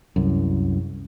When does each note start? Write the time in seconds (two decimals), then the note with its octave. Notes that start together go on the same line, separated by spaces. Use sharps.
0.16 C2 F#2